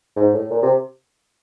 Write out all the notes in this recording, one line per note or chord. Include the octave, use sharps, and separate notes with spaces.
G#2
A2
A#2
C3